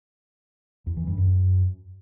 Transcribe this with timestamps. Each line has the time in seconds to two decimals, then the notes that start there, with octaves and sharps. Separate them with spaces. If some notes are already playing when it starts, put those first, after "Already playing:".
0.86 E2
0.97 E3
1.07 G2
1.17 F#2